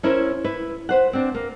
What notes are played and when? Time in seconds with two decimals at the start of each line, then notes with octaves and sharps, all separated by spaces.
0.03 C#4 E4 A#4 C5
0.44 E4 B4
0.89 B4 C5 F#5
1.13 C4 D4
1.34 A#3